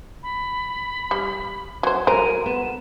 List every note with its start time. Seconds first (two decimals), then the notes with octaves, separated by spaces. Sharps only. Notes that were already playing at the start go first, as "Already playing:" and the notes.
0.23 B5
1.11 G3
1.83 F#3 C5 G#6
2.07 F#3 A#4 C5 D#7
2.46 B3 E7